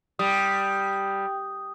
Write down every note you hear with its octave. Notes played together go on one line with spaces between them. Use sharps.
G3 G5 D#6